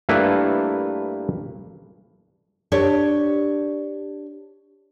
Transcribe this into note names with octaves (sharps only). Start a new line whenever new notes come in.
G2 A3 A#3 E4 B4
D4 G4 C#5